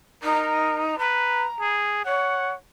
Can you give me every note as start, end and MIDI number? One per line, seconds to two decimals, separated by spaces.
0.23 0.98 63
0.23 0.83 70
0.99 1.47 71
0.99 1.71 82
1.61 2.04 68
2.05 2.52 73
2.05 2.55 78